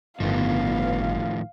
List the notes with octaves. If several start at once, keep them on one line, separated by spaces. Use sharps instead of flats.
G1 A2 D#3 F3 B3 F5